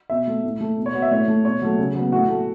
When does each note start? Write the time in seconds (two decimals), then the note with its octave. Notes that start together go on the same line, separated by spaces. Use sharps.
0.10 B2 E5
0.28 A3
0.44 A2
0.61 A3
0.78 B2
0.86 C#5
0.94 B3 F#4
1.02 E5
1.11 A2 C#5
1.28 A3
1.45 B2 C#5
1.62 F#3 A3
1.79 C#3
1.95 F#3 B3
2.12 A2 F#4
2.29 A3